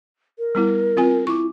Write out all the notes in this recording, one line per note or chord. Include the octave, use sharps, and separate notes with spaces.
A#4
G3 B3 E4
C4 F4 G#5
E4 C#6 D6